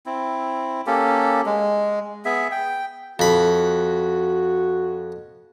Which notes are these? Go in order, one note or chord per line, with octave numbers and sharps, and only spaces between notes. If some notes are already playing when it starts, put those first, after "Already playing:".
C4 E4
A#3 C#4 G4 A4
G#3
B3 G#4 E5
G5
F2 F#4 B5